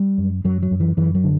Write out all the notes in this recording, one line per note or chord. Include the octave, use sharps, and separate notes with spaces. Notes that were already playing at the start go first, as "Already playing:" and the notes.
Already playing: G3
F#2
F#2 F#3
F#3
F#2
E3
F#2 E3
F#3
D3